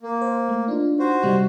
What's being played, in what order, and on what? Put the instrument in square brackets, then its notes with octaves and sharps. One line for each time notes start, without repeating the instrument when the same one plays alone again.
[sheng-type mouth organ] A#3
[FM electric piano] C5
A3
D4 D#4 F4
[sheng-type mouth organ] F#4 C5
[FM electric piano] C3 G3 D#4